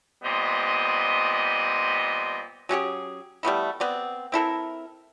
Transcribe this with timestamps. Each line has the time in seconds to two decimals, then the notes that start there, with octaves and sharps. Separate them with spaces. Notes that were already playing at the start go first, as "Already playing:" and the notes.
0.24 A#2 G3 B3 C4 D#5
2.69 F#3 C#4 G4 G#4
3.43 G3 A3 B3 E4
3.80 B3 C4 D5
4.32 C4 E4 A4 A#4